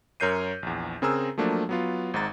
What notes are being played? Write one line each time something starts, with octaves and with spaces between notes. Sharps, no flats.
F#2 A#4 C#5 G6 C7 D#7
A#1 E2
C#3 C4 G#4 A#4 A#5 E6
F3 F#3 A3 A#3 D4
F#3 B3 F4
G#1 G#2 A#5 A6